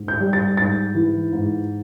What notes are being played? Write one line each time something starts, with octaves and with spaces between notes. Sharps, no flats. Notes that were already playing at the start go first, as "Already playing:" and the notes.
Already playing: G#2
G6
G3
A6
G#2 A6
E3
G#2